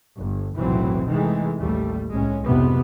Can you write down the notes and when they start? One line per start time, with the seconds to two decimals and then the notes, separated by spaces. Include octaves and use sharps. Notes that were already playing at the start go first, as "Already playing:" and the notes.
0.17 G1
0.57 F1 B1 A2 E3 F#3 C4
1.06 C3 D#3 E3 G#3 A3
1.60 A1 D#2 G3 A3
2.12 C2 A2 G#3 C#4
2.45 B1 F2 G#2 C3 B3